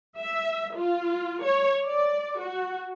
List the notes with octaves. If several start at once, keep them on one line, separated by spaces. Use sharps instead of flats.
E5
F4
C#5
D5
F#4